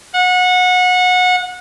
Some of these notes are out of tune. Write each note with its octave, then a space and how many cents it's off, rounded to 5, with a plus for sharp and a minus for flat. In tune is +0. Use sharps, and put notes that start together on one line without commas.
F#5 -25